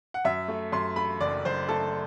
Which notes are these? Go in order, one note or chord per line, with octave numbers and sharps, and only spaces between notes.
F#5
F#2 E5
A3
F#2 C6
A3 B5
F#1 D5
F#1 C5
A3 A4